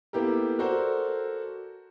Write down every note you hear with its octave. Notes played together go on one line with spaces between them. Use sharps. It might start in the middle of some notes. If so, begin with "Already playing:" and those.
A#3 B3 E4 G4 A4 A#4
F#4 A4 A#4 C5 D5